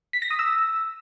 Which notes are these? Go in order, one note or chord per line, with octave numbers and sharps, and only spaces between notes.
B6
A#6
D#6
E6